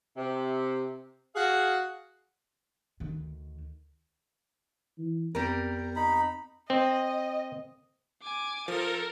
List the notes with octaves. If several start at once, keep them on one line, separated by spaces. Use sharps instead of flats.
C3
F#4 G#4 F5
D2 D#3
E3
F2 G3 B3 C4 A#4
D#4 B5
C4 D#5
G#5 D6
F3 A4 A#4